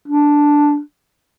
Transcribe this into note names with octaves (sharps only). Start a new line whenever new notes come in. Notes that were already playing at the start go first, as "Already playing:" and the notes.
D4